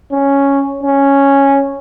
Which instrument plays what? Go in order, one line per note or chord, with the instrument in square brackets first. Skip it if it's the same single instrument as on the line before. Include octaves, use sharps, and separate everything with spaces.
[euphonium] C#4
C#4